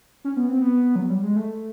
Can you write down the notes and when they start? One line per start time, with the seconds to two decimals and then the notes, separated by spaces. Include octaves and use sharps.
0.24 C#4
0.37 B3
0.49 C4
0.61 B3
0.96 F#3
1.09 G3
1.23 G#3
1.36 A3